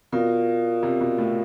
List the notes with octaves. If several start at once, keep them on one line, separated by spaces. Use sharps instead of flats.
B2 F4 A#4 D5 F5
C3
B2
A2